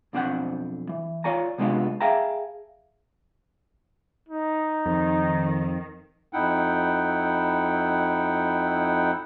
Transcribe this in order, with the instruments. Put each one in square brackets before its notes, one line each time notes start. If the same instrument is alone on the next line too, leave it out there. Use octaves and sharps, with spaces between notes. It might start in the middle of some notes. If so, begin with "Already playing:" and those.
[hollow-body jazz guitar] B1 F2 C4 D4 C5 F#5
E3
F4 C#5 D5 G#5 A#5
C3 G#3 B3 D4 F4
G#4 E5 F5 G5 A5 A#5
[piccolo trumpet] D#4
[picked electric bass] F2 [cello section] D#3
[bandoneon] F2 D#4 E4 F#5 G5